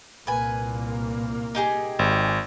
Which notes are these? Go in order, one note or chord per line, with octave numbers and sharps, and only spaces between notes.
C2 A#2 A#3 B4 G#5
D#4 G4 G#4
G#1